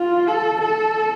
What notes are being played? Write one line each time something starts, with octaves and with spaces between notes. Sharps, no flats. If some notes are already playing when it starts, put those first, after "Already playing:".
Already playing: F4
A4
A4